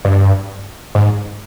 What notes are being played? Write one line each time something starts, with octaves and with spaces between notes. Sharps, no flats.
G2
G#2